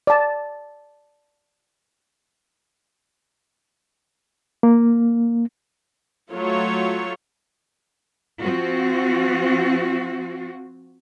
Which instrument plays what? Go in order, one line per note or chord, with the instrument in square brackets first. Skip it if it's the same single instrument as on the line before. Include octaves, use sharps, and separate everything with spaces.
[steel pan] D5 A5
[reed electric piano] A#3
[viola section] F#3 A3 F4 C#5
[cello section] F3 C4 F4 F#4